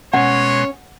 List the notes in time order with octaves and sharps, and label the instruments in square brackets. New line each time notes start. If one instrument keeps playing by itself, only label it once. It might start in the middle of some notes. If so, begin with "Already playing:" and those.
[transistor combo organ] B2 G#3 C6 [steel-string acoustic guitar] C#4 [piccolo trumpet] C#5 [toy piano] F#5